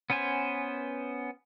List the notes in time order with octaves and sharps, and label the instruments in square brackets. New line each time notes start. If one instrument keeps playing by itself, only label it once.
[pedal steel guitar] B3 C#4 B4 C5 G#5